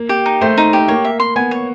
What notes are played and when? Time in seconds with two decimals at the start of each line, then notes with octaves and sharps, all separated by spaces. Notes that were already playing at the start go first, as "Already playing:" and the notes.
Already playing: A#3
0.09 G4
0.26 D#4
0.41 A3 C5
0.57 D#4
0.73 G4
0.88 A#3 C#5
1.04 E5
1.20 C6
1.36 B3 G#5
1.51 C#5